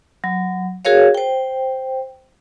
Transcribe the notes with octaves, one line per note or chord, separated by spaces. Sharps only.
F#3
F#4 G#4 A#4 C#5 F5
C5 G5